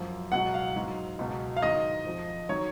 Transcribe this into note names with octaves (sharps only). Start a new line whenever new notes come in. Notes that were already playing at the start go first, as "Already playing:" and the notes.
Already playing: F#2 F3
C#2 B2 F#3 F#5
F5
G#2 F#3
C#2 B2 F#3
F5
G#2 D#3 F#3 D#5
F2 F3
D#3 F#3 C#5